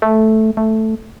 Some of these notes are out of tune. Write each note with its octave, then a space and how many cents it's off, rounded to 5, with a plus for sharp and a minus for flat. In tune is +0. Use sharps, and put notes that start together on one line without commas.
A3 -5
A3 +0